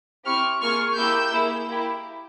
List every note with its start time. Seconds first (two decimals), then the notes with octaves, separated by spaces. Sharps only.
0.25 C4 E4 G4 C#6 F6
0.60 A#3 F4 G#4 C#6 F6
0.96 A#3 E4 G4 E6 G6
1.32 A#3 E4 G#4
1.67 A#3 E4 G4